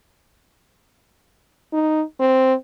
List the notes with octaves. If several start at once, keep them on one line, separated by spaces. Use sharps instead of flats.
D#4
C4